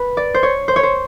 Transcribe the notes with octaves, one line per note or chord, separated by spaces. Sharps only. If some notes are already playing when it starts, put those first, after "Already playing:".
Already playing: B4
D5
C5
C#5
C5
C#5
C5